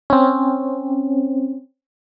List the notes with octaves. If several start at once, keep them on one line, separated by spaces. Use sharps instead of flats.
C4 C#4